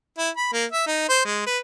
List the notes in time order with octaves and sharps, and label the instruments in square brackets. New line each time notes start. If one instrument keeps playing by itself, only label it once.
[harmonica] E4
B5
A#3
E5
D#4
C5
G#3
B4